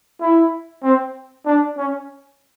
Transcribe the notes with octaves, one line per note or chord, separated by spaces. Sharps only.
E4
C4
D4
C#4